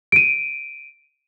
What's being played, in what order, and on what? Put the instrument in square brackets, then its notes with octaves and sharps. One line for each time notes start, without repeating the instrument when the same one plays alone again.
[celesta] D7 D#7